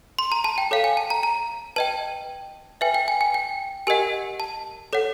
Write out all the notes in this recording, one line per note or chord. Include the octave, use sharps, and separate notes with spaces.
C6
A#5
A5
G5
A4 C#5 F5
G#5
A5
A#5
A#5
B4 D#5 G5 A5
B4 E5 G5 G#5
G5
G#5
G#5
G5
G4 A#4 D#5 F#5 G#5
A5
A4 C#5 F#5